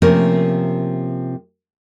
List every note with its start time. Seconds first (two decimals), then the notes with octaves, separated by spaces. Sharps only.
0.02 C3 F3 A3 A#3 C#4 A#4